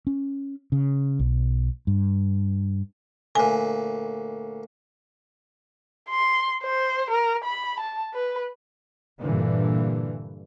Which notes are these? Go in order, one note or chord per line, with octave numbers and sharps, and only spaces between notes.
C#4
C#3
B1
G2
D2 A#2 G#5
C6
C5
A#4
B5
A5
B4
G2 A#2 D3 E3